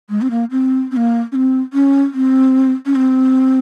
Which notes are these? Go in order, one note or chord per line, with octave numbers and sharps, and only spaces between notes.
G#3
C4
A#3
C4
C4
A#3
C#4
C4
C#4
C4
C#4
C4